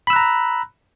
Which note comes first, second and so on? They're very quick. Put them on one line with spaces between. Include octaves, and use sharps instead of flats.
B5 E6 F#6 A#5